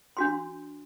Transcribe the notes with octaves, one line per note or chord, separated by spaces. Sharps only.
D4 F#4 C6